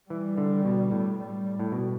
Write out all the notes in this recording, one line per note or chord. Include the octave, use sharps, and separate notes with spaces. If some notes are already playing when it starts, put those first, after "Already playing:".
E3 G3
D3
B2
A2
G3
A2
B2